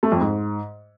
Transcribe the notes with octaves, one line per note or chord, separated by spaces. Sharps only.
A3
F2
G#2